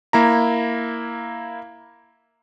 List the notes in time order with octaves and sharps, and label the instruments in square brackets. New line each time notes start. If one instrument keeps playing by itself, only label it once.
[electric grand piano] A#3 E4 A#5